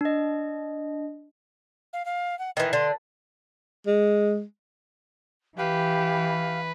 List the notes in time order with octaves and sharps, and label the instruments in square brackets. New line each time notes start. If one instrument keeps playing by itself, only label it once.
[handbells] D4 D#5
[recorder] F5
F5
F#5
[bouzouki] D#3 E3 [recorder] D#5
[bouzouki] D3 [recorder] C6
[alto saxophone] G#3
[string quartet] E3 [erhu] G4 [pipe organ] B4 [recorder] F5